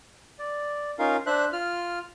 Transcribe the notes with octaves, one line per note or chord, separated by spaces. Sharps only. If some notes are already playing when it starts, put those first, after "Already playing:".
D5
C#4 D#4 F4 A#4 F5
D4 C5 E5 F#6
F4 F6